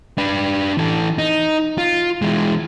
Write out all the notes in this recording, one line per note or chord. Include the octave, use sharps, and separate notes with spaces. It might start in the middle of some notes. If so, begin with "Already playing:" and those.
D4 B4
E3 A4
D#4
F4
E3 G#3